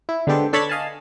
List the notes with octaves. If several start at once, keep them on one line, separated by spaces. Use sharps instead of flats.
E4
D3 G#3 B3 G4 A4 C5
D4 A4 C#5 B5 G#6 A6
D#5 F5 G#5 A5